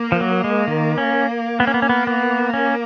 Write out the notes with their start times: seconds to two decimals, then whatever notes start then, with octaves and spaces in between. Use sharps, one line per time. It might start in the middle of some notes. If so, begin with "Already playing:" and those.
Already playing: A#3
0.12 F3
0.21 F#3
0.44 G#3
0.67 D#3
0.98 C#4
1.60 A#3 B3
1.67 C#4
1.74 B3
1.82 C#4
1.89 B3
2.07 B3
2.54 C#4